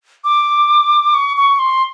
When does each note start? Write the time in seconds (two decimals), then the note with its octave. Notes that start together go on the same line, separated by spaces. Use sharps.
0.24 D6
1.14 C#6
1.37 C#6
1.59 C6